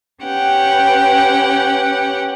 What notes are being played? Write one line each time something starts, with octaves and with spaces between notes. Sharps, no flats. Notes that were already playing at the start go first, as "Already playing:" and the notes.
C#4 G4 B4 F#5 G5